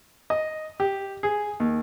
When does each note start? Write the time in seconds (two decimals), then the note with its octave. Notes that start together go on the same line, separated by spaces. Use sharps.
0.30 D#5
0.80 G4
1.23 G#4
1.60 D#2